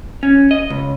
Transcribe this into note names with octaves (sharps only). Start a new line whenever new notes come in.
C#4
D#5
C#2